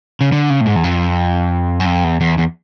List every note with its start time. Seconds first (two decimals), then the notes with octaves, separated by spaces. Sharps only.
0.21 C#3
0.32 D3
0.50 C#3
0.61 A2
0.66 G#2
0.76 E2
0.84 F2
1.80 F#2
1.86 F2
2.04 E2
2.21 E2
2.38 E2